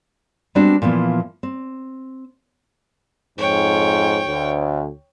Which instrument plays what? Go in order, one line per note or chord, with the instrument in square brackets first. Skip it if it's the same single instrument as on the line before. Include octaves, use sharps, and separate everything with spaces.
[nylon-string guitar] G3 G#3 B3 C4 D4 F#4
A#2 E3 F3 B3
C4
[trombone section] F2 G#2 [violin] C#5 G5
[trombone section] D2